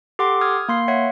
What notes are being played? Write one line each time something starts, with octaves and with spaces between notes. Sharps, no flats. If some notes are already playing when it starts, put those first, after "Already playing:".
G4 A4 F#5 C6 D6
D#6 F6 G#6
A#3 C6 C7
C#5 E5 F#5